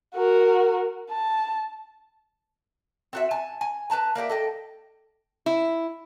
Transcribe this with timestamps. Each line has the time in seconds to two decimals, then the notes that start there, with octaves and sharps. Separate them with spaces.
0.15 F#4 A#4
1.10 A5
3.13 C4 F#4 E5
3.31 G#5 A5
3.61 G#5
3.90 B4 C5 A5 A#5
4.15 A#3 D4 G4 E5
4.29 A4 D#5 G5
5.46 E4